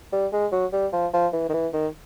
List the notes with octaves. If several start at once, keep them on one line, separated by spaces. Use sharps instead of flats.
G3
G#3
F#3
G3
F3
F3
E3
D#3
E3
D#3